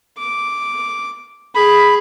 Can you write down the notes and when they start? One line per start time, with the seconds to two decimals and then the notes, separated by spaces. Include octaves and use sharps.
0.17 D6
1.55 G#4 B5